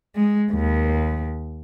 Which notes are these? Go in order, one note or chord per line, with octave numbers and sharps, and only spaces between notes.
G#3
D#2